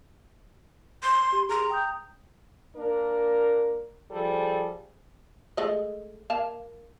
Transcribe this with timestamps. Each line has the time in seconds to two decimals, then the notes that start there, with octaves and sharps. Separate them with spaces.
1.03 C6
1.32 G4
1.49 G#4 A#5 C6
1.70 G5 D#6 G6
2.77 A#3 D4 A#4
4.11 F3 G3 G#4 A4
5.57 G#3 A3 D#5
6.30 A#3 F5 A5